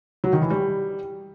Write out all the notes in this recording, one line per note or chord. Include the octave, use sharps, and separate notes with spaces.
F#3
D#3
E3
G3